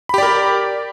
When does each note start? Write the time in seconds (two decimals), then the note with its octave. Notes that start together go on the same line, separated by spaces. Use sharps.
0.09 B5
0.14 G4
0.18 D5
0.23 A#4